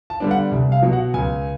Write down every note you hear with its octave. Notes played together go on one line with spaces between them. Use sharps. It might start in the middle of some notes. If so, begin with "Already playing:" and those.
A5
D3 G3 B3 D4
F#5
C2
F5
B2 F#3
F#5
C#2 G#5